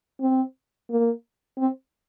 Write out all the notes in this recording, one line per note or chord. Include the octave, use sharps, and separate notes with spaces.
C4
A#3
C4